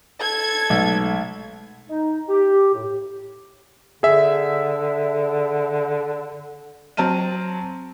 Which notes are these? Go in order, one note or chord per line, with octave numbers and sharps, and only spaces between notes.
A4 G#6
B1 G#3 A3
D#4
G4
A2
D3 G#4 E5
F#3 C4 A5 F6 D#7